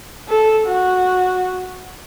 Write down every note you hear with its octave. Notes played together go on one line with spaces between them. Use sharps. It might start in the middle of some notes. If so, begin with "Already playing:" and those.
A4
F#4